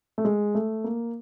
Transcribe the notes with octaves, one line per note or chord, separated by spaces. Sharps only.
A3
G#3
A3
A#3